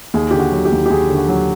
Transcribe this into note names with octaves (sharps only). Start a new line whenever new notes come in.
D#2 G#4
D3 G4
F#4
F#3
G4
D#2
G4
D#2 G#4
D3
F#4
F#3